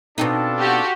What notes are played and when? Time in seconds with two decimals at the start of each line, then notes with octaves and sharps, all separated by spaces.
0.18 B2 C4 D4 D#4 F4 A4
0.59 F#4 G4